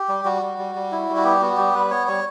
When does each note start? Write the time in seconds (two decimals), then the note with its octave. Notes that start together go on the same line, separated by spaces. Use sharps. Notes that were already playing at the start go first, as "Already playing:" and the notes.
Already playing: G4
0.09 G3
0.25 G3 F#4
0.42 G3
0.58 G3
0.75 G3
0.92 E4
1.09 G3
1.17 F#4
1.24 B3 G4
1.42 B3 F#4
1.57 G3 G4
1.74 G3 B4
1.91 B3 C#5
2.07 G3 C#5